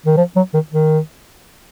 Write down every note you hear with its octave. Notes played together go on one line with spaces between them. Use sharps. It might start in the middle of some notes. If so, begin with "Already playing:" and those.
D#3
F3
F#3
D#3
D#3